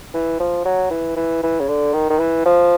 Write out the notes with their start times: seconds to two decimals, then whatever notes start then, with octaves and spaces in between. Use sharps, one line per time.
0.14 E3
0.40 F3
0.65 F#3
0.90 E3
1.16 E3
1.43 E3
1.60 C#3
1.68 D3
1.94 D#3
2.10 D#3
2.19 E3
2.46 F3